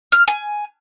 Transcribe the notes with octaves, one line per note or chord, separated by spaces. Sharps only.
F6
G#5